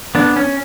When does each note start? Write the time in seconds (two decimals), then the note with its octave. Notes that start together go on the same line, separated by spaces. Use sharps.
0.15 B3 D4
0.36 C#4